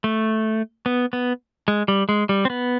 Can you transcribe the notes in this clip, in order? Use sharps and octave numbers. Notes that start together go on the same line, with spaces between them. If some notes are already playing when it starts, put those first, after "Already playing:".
A3
B3
B3
G#3
G3
G#3
G3
C4
B3